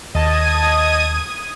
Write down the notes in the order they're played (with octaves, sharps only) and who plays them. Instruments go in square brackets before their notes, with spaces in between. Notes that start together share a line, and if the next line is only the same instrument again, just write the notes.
[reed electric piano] D#2 [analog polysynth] D#5 A5 [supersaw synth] D#6 G#6 D#7